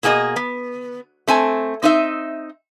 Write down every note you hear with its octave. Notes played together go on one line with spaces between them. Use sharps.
B2 A#3 G#4 A4 D#5
B3
A3 C4 G#5 A5
C4 D#4 D#5 E5